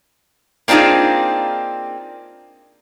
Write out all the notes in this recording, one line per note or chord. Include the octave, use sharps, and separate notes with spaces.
A#3 C4 D4 D#4 F4 G#4